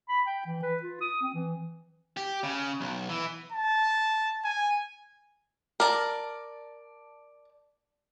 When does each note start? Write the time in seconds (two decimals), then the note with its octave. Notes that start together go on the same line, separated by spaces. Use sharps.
0.09 B5
0.27 G5
0.46 E3
0.62 B4
0.83 F4
1.01 D#6
1.22 C4
1.34 E3
2.17 G4
2.43 C#3
2.81 B1
3.09 E3
3.52 A5
4.44 G#5
5.80 A#4 D5 A5